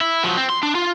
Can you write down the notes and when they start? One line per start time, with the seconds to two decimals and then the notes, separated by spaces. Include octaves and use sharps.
0.01 E4
0.24 F3 F#3
0.37 C4
0.49 C6
0.63 D4
0.75 F4